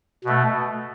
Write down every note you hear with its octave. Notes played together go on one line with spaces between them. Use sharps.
B2 A3